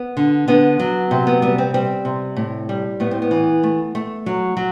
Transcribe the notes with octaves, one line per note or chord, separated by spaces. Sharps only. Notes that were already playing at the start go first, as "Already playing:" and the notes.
Already playing: B3
D3
D3 B3
F#3
C3
B3
G3 B3
C4
G3 C4
C3
A2
G3
A2 B3
C4
B3
E3
A3
A3
F#3
F#3